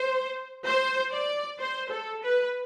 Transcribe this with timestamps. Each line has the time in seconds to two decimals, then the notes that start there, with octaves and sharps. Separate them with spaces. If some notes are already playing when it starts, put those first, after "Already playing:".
Already playing: C5
0.65 C5
1.12 D5
1.60 C5
1.91 A4
2.23 B4